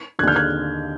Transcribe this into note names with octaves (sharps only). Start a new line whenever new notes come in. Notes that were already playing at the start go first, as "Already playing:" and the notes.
D#2 D3 F6 F#6 G6 G#6
F#6 G#6